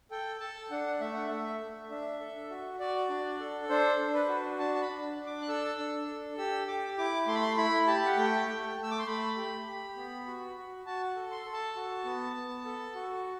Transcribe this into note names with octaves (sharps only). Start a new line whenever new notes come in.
A4 G5
A4 A5
D4 F#5
A3 E5
F#5
A3 E5
A3
D4 E5
A4
F#4
F#4 D5
D4
A4
D4 C5
D4
B4
F#4
D4 A5
A5
B5
D4
D4
D6
F#6
A4 E6
D4
A4
G4 E6
G4 D6
E4 D6
A3 C6
B5
C6
E4 B5
G4 A5
F#5
A3 G5
A3
A3
E6
D6
C6
A3 B5
G4
G4
B3
F#4
F#4
F#4 A5
A4
C6
A4
A5
F#4
B3
B3
A4
F#4